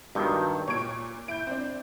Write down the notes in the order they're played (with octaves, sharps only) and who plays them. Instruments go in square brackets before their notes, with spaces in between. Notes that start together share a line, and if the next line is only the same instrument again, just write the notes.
[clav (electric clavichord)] G2 D#3 [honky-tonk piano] F#3 C#6 G6
[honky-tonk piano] A#2 D7 [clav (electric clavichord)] C#5
[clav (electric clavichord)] E4 [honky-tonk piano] G6 D7
[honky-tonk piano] C4 D4